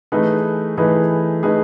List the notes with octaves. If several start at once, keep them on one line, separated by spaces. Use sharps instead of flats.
E3 A3 D#4 G#4 B4
E3 A3 D#4 G#4 B4
E3 A3 D#4 G#4 B4